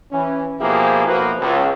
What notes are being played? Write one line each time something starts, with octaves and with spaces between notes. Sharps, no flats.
E3 C#4
B2 F3 A#3 E4 G4 G#4
B1 F3 A#3 F#4 B4
C#2